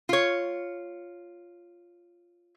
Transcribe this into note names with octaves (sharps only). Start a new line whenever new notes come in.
F4 C#5